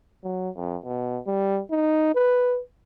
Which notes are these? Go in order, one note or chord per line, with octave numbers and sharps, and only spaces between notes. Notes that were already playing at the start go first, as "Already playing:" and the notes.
F#3
F2
B2
G3
D#4
B4